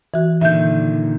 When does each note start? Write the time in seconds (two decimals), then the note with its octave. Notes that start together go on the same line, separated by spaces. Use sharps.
0.14 E3 F#4
0.41 A#2 D3 D#3 E5 G6